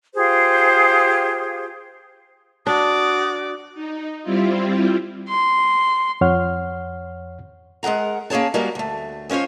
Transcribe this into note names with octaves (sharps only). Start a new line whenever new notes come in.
F4 G4 G#4 C5
D4 F#4 D5 D#6
D#4
G3 C4 E4 F4
C6
F2 C#5 F#5 F6
G#3 G#4 A#4 F#5 A#5
A#3 C#4 G#4 C#5 A5
G3 G#3 A#3 F#4 A#4 D#5
D2 A3
G#3 C#4 F4 C5 C#5